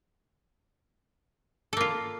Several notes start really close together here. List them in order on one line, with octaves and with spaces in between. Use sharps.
A4 A#3 F4